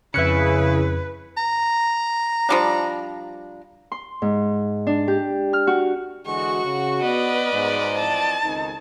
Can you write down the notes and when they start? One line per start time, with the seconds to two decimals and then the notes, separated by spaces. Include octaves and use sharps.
0.14 F2 C#3 E4 B4 F#6 C#7
1.37 A#5
2.49 F3 G3 D4
3.92 C6
4.22 G#2
4.87 D4
5.08 G4
5.53 F6
5.67 F#4
6.26 D3 E3 G#3 F#4 C#6
6.64 C#3
7.02 B3 B4 D5 D#5
7.53 G#2 B2 G3 B3
7.96 E3 F3 C4 A5
8.44 C#2 D#3 C4 D#4 A4